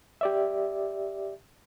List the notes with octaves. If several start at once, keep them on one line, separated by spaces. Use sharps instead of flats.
G4 D5 E5